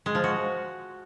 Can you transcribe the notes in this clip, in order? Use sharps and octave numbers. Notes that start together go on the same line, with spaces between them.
G#3
F3
F#4